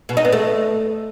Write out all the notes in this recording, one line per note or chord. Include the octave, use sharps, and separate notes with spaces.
B2
D#4
B3
A3